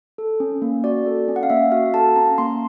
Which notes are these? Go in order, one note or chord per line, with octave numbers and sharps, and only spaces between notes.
A4
C#4
A#3
F#4 D5
A4
C#4
F#5
F5
A#3 E5
F#4 F5
A4 A5
C#4 A#5
A#3 C6